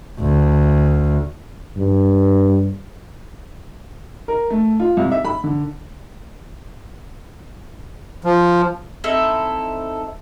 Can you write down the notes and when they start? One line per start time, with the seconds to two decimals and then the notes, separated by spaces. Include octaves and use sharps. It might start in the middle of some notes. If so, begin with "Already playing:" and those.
0.20 D2
1.77 G2
4.28 A#4
4.50 A3
4.80 F4
4.97 C2
5.12 E5
5.25 B5
5.44 D3
8.24 F3
9.04 C4 D#4 E4 A4